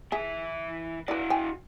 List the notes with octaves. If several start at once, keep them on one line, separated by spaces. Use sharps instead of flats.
E3 G#4 E5
E4 F#4 B4 D5
G5 G#5